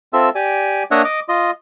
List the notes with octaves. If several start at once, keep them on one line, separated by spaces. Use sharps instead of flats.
C4 F4 A4 E5 E6
G4 D5 G#5
A#3 D4 C#5 D#5 E5 F#5
D#5 D6
F4 D#5